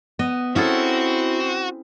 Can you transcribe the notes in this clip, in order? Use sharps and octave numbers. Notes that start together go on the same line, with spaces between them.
B3 D#5
C4 C#4 E4 F#4 G#4 A4